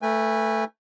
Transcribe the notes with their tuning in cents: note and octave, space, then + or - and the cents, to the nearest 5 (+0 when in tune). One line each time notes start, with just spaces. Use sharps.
A3 +10 B4 -10 G#5 -25